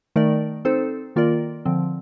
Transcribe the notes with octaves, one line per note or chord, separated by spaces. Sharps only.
D#3 A3 D#4 A#4 D5
C4 D#4 A4 C5
D#3 A#3 F4 A#4 D5
D3 F3 C4